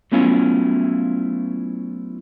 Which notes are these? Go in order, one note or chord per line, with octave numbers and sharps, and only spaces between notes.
F#3 A3 B3 C#4 E4 F4